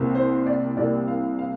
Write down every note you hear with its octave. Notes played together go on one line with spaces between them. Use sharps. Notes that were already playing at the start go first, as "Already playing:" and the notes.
Already playing: C2 C3 A#3
C5
D5
C2 C3 G3 A#3 D5
F5
F5